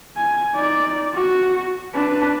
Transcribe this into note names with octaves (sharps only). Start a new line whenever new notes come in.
G#5
D#4 D5
F#4
D4 B4